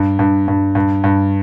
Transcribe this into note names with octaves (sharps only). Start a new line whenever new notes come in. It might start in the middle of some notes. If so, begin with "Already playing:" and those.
Already playing: G2
G2
G2
G2
G2